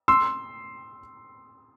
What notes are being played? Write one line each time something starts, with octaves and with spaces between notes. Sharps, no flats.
C6 E6